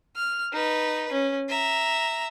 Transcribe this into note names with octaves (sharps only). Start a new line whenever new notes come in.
F6
D#4 B4
C#4
E5 A#5